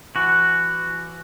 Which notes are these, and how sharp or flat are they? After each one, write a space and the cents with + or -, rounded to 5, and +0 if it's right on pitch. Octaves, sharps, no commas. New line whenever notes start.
E3 +30 F#4 +0